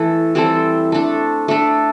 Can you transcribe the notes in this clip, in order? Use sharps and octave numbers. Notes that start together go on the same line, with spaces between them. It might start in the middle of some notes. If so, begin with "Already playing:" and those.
Already playing: E3 A3 E4 A4
E3 G3 C4 A4
A3 D4 A4
A3 D4 A4